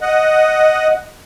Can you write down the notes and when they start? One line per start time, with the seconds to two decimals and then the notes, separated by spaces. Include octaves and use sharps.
0.01 D#5 F#5